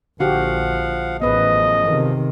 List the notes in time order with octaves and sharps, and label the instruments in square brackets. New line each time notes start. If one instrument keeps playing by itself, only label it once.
[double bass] A#1 [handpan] D3 F#4 G4 [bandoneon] F3 F5 F#5
[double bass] A1 [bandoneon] F#2 C#3 F3 [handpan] B3 B4 [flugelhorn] D#5
[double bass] C3 D#3